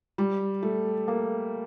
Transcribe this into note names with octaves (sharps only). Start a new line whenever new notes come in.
G3
A3
A#3